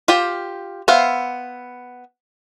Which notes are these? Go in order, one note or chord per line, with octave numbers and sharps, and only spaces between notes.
F4 G4 C5
B3 C5 E5 F5